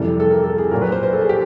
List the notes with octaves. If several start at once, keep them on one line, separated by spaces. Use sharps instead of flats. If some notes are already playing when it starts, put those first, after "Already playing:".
Already playing: F2 C3 E3 G3 A4
A4
A#4
A4
G#4
A#2 F#3 A#4
B4
C5
C5
A4
G#4
G4